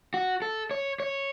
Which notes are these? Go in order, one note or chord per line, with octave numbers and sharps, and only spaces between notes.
F#4
A4
C#5
C#5